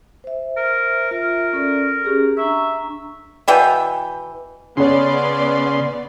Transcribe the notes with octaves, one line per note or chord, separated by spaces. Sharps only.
C5 E5
A#4
F4 A#4 E5
C#4 A4 D5
C#4 G4 G#4
D4 E5 A#5 C#6
B2 E3 G5
C#3 B3 C#4 C#5 D5 C6